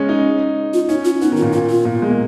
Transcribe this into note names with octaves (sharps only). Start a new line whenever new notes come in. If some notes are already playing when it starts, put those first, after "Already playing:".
Already playing: C#3 G#3 C#4
D#4
F4
C#4 D#4
F4
B3 D#4
D#3
F4
A#2
A#2 F4
F4
A#2
B2
G#3
A#3